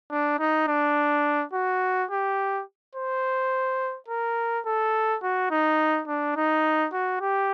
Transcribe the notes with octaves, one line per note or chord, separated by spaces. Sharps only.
D4
D#4
D4
F#4
G4
C5
A#4
A4
F#4
D#4
D4
D#4
F#4
G4